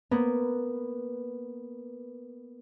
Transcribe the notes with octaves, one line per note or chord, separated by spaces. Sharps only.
A#3 B3